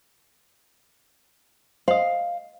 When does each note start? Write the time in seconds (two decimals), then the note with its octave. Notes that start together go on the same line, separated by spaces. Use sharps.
1.88 C5 D#5 F5